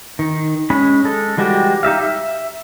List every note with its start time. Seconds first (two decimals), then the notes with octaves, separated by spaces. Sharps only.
0.19 D#3
0.70 G#3 C#4 B5
1.04 G#3 A4
1.37 E3 G3 G#3 F#4 G4
1.83 D#4 G4 E5 F5
2.00 E5